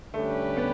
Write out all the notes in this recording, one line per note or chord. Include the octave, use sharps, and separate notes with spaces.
D3 G3 A3 C#4 G4 B4
B3